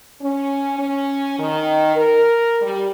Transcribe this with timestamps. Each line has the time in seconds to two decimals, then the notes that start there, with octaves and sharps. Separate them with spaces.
0.21 C#4
0.78 C#4
1.38 D#3
1.96 A#4
2.61 G3